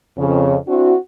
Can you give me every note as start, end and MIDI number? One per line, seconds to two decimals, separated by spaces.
0.17 0.56 41
0.17 0.56 49
0.68 0.95 60
0.68 0.95 62
0.68 0.95 64
0.68 0.95 66